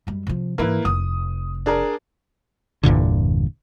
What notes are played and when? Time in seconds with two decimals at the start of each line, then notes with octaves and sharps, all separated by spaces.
0.07 F#2 G3
0.27 C3 F3
0.58 G#2 E3 A#3 E4 B4
0.85 F1 D#6
1.66 D4 G#4 A#4
2.83 G1 E2 A#2 D3